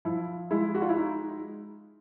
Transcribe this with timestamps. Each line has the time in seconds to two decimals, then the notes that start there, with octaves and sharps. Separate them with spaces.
0.05 F3 E4
0.51 G#3 E4
0.75 F#4
0.82 F4
0.89 E4
0.97 D#4